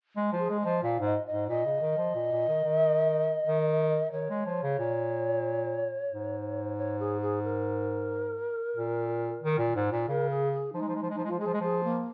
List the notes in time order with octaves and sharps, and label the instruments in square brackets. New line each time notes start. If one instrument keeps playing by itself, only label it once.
[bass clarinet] G#3
[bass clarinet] F3 [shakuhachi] F4
[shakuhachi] G#4
[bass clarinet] G#3
[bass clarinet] F3 [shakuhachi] D#5
[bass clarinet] A#2 [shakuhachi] F5
[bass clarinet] G#2 [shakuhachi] D#5
[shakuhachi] D#5
[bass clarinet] G#2
[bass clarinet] A#2 [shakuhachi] D#5
[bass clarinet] C#3
D#3
F3
A#2
A#2
D#3
D#3
D#3
[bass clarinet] D#3 [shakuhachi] C#5
[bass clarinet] G#3
F3
C#3
A#2
G#2
[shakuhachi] C#5
G#4
G#4
A#4
[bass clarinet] A#2
D#3
A#2
G#2
A#2
[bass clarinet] C#3 [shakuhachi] A#4
[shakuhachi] G#4
G#4
[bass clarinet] F3 [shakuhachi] D#4
[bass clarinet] G#3
F3
G#3
F3
G#3
[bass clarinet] F3 [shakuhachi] D#4
[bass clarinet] G#3
[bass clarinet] F3 [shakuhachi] F4
[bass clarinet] G#3 [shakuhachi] G#4
[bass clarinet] F3
G#3
[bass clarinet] F3 [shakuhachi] G#4
[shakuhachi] A#3